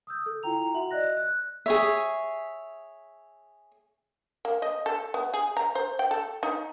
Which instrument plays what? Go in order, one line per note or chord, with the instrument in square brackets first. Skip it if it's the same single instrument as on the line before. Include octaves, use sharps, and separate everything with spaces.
[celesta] D#6 E6 G6
A4
E4 F4 G5 A#5 F7
F#4 E5 F#5 F#7
D5 D#5 F#6 A#6
F#6
[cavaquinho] G#4 C#5 E5
[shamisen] A#3
D#5
A4
B3
G#4
A#5
C5
G5
A4
D#4